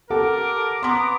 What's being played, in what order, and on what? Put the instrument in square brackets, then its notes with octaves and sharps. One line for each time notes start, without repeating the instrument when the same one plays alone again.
[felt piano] G4 A4 F#5 [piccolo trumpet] A#4 [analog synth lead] D6
[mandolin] B3 A#5 [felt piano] C6